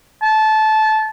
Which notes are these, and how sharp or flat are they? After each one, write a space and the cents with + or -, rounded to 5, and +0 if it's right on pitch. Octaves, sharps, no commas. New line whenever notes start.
A5 -20